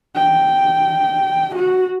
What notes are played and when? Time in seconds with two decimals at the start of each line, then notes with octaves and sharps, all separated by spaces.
0.16 G5
1.56 F#4